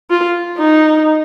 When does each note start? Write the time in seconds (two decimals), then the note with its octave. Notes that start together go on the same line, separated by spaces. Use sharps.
0.10 F4
0.58 D#4